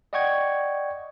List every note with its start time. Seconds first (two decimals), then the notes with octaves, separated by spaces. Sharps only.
0.13 D5 D#5 F#5 G5 C#6 G#6